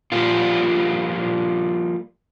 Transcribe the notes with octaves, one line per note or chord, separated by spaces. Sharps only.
F3 G3 A#3 F4